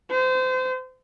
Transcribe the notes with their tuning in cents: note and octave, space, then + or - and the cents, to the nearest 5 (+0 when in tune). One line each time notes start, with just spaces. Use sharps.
C5 -30